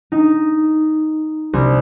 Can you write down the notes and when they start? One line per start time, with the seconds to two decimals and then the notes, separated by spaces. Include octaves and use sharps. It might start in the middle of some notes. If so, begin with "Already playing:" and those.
0.12 D#4
1.53 C2